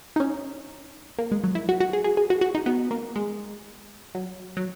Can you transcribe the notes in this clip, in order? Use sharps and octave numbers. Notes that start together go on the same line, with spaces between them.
D#4
C#4
A#3
G#3
F#3
E4
F#4
F#4
G#4
G#4
G#4
F#4
F#4
D#4
B3
A#3
G#3
F#3
F#3